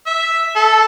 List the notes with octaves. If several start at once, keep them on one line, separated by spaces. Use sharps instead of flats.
E5
A4